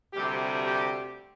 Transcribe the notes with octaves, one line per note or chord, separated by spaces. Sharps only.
D2 C3 G3 G4
G4